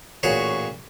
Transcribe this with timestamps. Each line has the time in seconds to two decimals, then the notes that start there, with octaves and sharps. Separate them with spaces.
0.23 A1 A#2 F#4 G#4 C#5